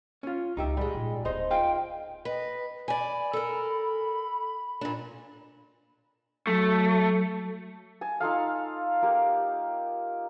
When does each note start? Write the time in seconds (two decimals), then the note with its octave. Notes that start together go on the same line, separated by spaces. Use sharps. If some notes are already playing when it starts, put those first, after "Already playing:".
0.23 C#4 F4
0.57 C#2 D#4 G4 E5
0.77 G#2 G3 G#3
0.95 A#2
1.25 D1 B3 D#4 C5 D#5
1.50 F4 G#4 F5 G5
2.25 B4 D#5
2.88 D5 G#5 B5
3.33 A4 A#4
4.81 A#2 D4
6.47 F#3 A3
8.01 G#5 A5
8.20 D#4 F4 A4 F5
9.02 A#3 G4